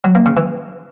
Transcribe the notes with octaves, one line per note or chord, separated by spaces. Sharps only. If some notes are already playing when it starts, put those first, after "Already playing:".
F#3
A#3
C#3
E3